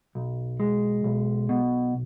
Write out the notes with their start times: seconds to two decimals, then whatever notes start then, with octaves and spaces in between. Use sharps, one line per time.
0.15 B1
0.60 G#3
1.04 B1
1.49 B2